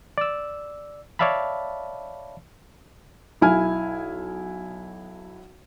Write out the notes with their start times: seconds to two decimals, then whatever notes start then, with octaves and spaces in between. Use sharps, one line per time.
0.18 D5 E6
1.19 C#5 D5 E5 F5 A5 B5
3.41 B1 E4 G#5 F6